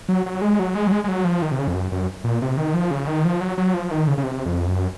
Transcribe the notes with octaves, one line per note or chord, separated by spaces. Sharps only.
F#3
F#3
G#3
F#3
G#3
F#3
G#3
G#3
F#3
F3
D#3
C3
C#3
F2
F#2
F#2
A#2
C3
D#3
F3
C#3
D#3
F3
F#3
F#3
F3
D#3
C#3
C#3
C3
F2
F#2